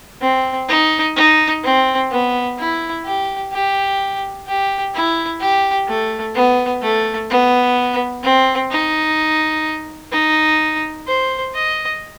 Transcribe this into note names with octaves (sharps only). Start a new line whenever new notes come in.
C4
D#4
D#4
C4
B3
E4
G4
G4
G4
E4
G4
A3
B3
A3
B3
C4
D#4
D#4
C5
D#5